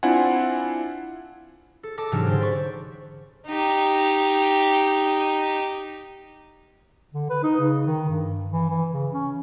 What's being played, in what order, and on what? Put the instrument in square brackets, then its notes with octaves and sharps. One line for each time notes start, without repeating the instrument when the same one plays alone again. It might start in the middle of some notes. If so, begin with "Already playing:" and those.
[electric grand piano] C4 D4 E4 F4 F#5 G#5
[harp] A4
A4 D#5 A5 D6 E6
G#2 C3 E3 F#3 C#4 D4
D3 C5
D5 B5 C#6
[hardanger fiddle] D#4 G4
[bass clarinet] D3
B4
D#4
C#3
D#3
G2
E3
E3
C#3
C#4